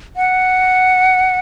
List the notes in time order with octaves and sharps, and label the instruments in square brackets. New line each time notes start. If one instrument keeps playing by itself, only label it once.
[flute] F#5